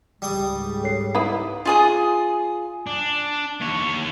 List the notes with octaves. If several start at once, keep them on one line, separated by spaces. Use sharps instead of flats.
C#2 G#2 G3 D#6
A4 C#5 C7
D#4 E4 B4
F4 G#4 D#6
D4
D#2 C#5